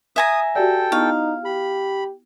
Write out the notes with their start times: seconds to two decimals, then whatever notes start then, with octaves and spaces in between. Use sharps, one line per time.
0.16 E5 G#5 A#5 D#6
0.55 F#4 G4 A4 D5 G5
0.92 B3 D#4 E4 F5 C#6
1.45 G4 B5